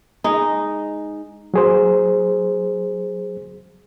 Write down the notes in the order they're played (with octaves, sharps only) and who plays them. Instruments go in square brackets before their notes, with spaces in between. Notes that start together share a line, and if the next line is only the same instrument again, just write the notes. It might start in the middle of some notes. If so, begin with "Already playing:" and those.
[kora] G#3 D#4
[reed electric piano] F#3 G#4 C5